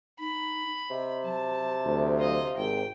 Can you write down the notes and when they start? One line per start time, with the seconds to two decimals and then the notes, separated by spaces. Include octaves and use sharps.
0.20 D#4 B5
0.90 C3 D#5
1.24 F#3 A5
1.85 D2
2.17 F4 D#5
2.57 G#1 G5